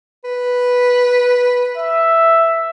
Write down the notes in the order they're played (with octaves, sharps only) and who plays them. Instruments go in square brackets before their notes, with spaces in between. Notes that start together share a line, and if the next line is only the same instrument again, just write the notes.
[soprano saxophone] B4
[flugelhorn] E5